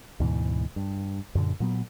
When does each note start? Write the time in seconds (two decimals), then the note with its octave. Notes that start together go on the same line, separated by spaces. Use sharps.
0.20 D2 G#2 B2 E3
0.76 G2
1.35 F#2 A#2 D3
1.60 A#2 F#3 B3